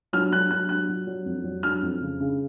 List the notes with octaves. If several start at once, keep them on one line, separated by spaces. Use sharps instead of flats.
F#3 F6
F#3 F#6
F#3 F#6
F#3 F#6
F#3
F#3
F2
F#3
F#3 F6
F2
C#3
C#3